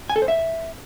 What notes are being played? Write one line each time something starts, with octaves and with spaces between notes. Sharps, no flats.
G#5
A4
C5
E5